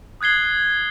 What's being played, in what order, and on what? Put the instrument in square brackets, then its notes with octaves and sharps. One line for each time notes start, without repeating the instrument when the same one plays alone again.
[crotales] D#6 F#6 G#6 C7 G7